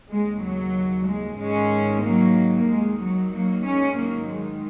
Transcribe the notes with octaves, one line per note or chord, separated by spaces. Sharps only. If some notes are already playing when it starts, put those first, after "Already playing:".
D#2 C#3 G#3
F#3
G#3
G#2 D#3 G#3 C#4
F#3 A#3
D#2 D#3 G#3
F#3
F#3 A#3
G#3 C#4
G#2 D#3 F#3 A#3
G#3